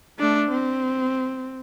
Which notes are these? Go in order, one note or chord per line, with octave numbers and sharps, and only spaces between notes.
A3 D4
C4